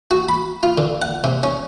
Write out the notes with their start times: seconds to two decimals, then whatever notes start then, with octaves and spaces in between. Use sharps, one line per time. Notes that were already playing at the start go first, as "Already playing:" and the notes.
0.11 F#4
0.29 B5
0.63 F4
0.78 D3
1.02 F#5
1.24 C3
1.43 C#4